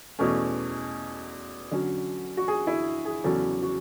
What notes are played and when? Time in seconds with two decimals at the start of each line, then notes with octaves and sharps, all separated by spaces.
0.19 E2 B2 A3 C#4
1.71 D3 F#3 C#4
2.37 F#4
2.48 G#4
2.67 E4
3.05 G#4
3.24 E2 C#3 F#3 C#4 A4
3.62 F#4